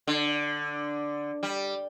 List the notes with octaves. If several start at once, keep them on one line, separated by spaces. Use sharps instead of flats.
D3
G3